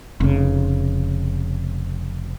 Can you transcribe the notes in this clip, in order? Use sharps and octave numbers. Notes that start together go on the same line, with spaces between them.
F1 C#3